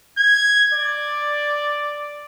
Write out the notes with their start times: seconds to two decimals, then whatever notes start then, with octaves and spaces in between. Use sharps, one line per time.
0.18 G#6
0.73 D5